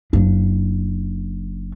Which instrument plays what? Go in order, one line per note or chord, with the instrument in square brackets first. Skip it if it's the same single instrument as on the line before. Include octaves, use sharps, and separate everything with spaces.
[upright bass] F#1 D4